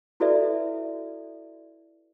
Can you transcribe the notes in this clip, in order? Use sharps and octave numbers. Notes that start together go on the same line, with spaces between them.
E4 F#4 A4 B4 D5 E5